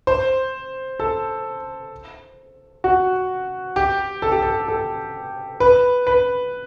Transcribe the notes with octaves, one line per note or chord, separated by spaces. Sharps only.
C5
A4
F#4
G4
A4
G4
A4
A4
B4
B4